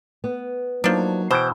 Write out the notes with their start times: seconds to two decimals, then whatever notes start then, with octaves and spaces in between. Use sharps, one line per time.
0.24 B3
0.84 F3 F#3 A#3 D4 D#4
1.31 B2 E3 C5 G5